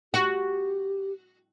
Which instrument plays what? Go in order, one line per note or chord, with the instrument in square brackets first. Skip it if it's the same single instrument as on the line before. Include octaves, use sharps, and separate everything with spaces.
[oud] F#4 [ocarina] G4